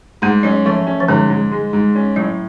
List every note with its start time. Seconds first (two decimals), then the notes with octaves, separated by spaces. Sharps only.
0.22 G#2 A3
0.43 F#3 C#4
0.66 F3 A3
0.87 C#4
1.00 F3
1.08 G#2 D3
1.30 G#2
1.51 G#3
1.73 G#2
1.95 C#4
2.16 A2 F#3